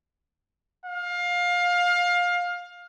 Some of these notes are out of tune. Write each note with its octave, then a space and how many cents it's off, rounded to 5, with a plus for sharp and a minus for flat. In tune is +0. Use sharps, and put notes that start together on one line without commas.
F5 +20